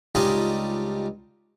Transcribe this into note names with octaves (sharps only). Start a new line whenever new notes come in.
C#2 G3 D4 D#4 F4 G#5